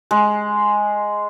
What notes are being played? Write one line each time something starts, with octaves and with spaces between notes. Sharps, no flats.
G#3